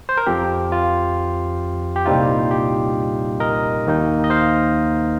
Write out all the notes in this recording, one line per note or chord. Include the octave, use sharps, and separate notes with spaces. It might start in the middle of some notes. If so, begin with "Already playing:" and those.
C5
A#4
F2 F3 C4 G4
F4
G4
C2 A#2 G3 C4 D#4 F4
G4
A#4 D#5
D#2 D#3 A#3 D#4
D#5
C5 F5